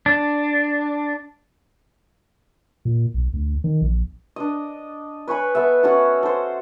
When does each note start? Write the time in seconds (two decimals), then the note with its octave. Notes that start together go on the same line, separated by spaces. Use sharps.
0.06 D4
2.85 A#2
3.14 B1
3.33 D2
3.64 D#3
3.82 A#1
4.36 D4 D#5
5.27 B4 C#5 G#5 B5
5.55 B3 A4 E5
5.83 C#4 F#4 A4 F#5
6.23 A4 C5